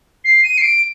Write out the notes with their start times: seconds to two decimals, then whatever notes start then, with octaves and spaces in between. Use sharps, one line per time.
0.25 C7
0.43 D#7
0.58 C7
0.62 D7